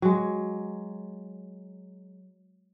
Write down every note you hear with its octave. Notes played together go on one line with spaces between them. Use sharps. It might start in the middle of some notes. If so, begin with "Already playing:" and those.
F#3 G#3